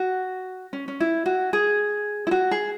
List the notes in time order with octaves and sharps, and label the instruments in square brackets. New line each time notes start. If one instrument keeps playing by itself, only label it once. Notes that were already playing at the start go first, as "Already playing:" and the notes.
Already playing: [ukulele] F#4
C#4
C#4
E4
F#4
G#4
E4
F#4
G#4